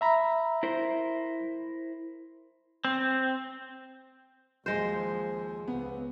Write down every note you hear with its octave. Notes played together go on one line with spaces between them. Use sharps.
E5 A#5 B5
E4 A#4 C5
C4
D#2 F3 G#3 C5
C#2 B3